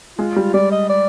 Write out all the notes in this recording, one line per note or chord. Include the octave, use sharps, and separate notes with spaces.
G#3 F4
G3
G3 D5
D#5
D5